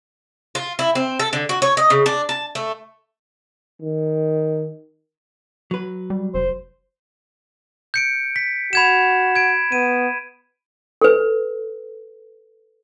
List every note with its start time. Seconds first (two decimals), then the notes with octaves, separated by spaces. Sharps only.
0.55 F4
0.79 E4
0.95 C4
1.19 A4
1.33 D3
1.49 F#4
1.62 C#5
1.77 D#5
1.90 C#3
2.06 D4
2.29 A5
2.55 A3
3.82 D#3
5.71 F#3 B4
6.10 G3
6.34 F1 C5
7.94 G6 C#7 D7
8.36 B6
8.73 F#4 B5 G#6 E7
9.35 G#6 D7
9.72 B3 D#7
11.01 A4 B4